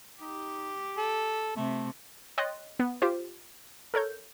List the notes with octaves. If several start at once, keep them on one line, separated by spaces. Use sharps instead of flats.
D#4 G4
A4
C3 A3
C#5 D#5 G5 C6 F#6 A6
B3
F4 G4 C5
A4 A#4 C#5 G6